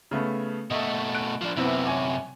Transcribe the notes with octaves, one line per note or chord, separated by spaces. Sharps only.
C#3 A3 B3
B2 A3 D#5 E5
F#6 D7
F3 D4
F#2 C3 B3 C4 E4
C#5 G#5 D6